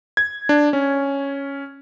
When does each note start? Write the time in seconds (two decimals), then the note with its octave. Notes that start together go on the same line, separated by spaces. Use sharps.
0.17 G#6
0.49 D4
0.73 C#4